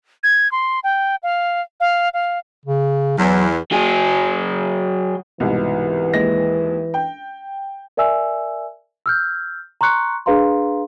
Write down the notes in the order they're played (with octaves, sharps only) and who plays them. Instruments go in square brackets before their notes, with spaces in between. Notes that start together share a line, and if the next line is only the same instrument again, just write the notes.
[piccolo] G#6
C6
G5
F5
F5
F5
[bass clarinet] C#3
[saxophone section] E2 [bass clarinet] F#3
[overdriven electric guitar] F#3 G#4
[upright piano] C2 G#2 B2 [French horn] E3
[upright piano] D#2 G#3 A#6
G5
[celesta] A#4 D5 E5 G#5 E6
E6 F6 G6
A#5 C6 C#6 F#6 C#7
D4 G#4 B4 F5 A#5 C6